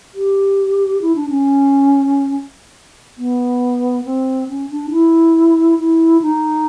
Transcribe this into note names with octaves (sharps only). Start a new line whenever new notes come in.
G4
E4
D4
C#4
B3
C4
C#4
D4
E4
E4
D#4